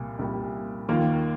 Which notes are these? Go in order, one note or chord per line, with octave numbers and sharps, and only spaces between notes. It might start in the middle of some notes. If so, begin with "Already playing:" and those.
Already playing: C2 A#2 G3
C2 A#2 G3
D#2 D#3 A#3 F4